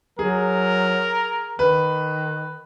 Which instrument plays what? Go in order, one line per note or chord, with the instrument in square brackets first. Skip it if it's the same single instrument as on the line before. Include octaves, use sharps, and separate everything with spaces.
[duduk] F#3 [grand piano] G#4 [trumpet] A#4
[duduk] D#3 [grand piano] B4